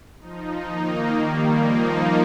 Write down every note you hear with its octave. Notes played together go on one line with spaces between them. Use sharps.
F3 D#4
D#3 A#3 D#4
D#3 G3 A#3
F3 A#3 D#4